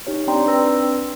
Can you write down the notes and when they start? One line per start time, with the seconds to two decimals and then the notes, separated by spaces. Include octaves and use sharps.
0.07 D#4 G4 C#5
0.27 C4 D4 D5 G5 A#5 C6
0.46 C4 D4 B4 E6 A#6